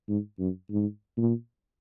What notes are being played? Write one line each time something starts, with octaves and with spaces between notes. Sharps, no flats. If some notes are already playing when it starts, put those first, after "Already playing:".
G#2
F#2
G#2
A#2